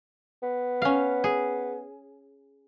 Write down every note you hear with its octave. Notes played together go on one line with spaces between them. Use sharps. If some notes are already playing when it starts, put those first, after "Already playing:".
B3
C#4 F5
G#4